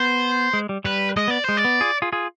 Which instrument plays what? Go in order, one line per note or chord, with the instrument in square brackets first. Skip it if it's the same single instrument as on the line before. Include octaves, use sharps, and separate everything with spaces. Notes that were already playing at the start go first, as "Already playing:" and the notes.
Already playing: [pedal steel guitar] B3 [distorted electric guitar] C5
[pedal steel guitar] G#3
G3
[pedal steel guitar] G3 [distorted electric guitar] B4
[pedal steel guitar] G#3 [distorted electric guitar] D#5
[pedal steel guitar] B3 [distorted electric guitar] D5
[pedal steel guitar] G#3 [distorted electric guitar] C5
[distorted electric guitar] D5
[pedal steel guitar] B3
F4 G#4
F4 G#4
F4 G#4